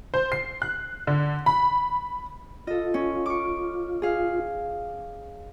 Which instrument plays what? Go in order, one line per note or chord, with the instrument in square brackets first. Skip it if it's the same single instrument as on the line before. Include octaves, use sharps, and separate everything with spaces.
[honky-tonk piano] C5
C7
F#6
D3
B5
[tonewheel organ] F4 [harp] A4 D#5
[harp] C#4
C#6 D6
G#4 F5